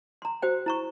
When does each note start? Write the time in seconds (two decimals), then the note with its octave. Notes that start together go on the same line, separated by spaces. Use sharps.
0.22 A#5 C6
0.42 F#4 C5 G5
0.66 E4 A#5 C#6